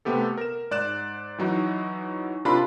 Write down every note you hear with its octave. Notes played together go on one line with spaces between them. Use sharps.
C3 A3 B3 G4 A4
A#4 E7
G#2 D5 F#6 E7
E3 F#3 D#4 F#4
C3 D4 F4 A#4 B5